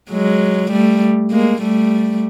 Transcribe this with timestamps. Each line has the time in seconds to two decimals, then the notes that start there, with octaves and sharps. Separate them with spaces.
0.11 F#3 G#3
0.71 G3 A3
1.31 G#3 A#3
1.61 G3 A3